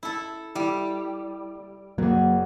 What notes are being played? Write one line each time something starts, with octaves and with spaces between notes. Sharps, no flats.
E4 A4
G3 E4
F#1 F#3 A#3 G#4